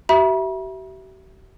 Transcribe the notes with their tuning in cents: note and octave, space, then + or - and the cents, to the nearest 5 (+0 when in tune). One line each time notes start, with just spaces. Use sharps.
G4 -45 E5 +0 B5 -45